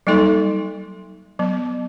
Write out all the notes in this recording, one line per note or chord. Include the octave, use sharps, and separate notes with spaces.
F#3 G3 A#3 D#4 A4 C6
F#3 B3